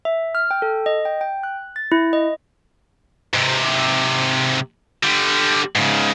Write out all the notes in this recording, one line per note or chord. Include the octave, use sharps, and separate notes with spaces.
E5
F6
G5
A4
D#5
G5
G5
F#6
A6
E4
D#5
G#2 C3
D3 G3
G#2 C#3